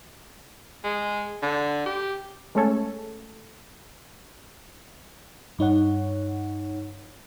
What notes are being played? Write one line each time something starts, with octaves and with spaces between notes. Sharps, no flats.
G#3
D3
G4
G#3 A3 C#4 A4 C#5
G2 D#4 C#5 F#5